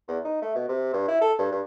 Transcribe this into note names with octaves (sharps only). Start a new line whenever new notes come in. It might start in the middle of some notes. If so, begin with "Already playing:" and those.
E2
D#4
A3
B2
C3
G2
E4
A4
G2
G2